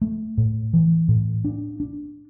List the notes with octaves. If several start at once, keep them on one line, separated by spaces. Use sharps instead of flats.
A3
A2
E3
A2
D4
D4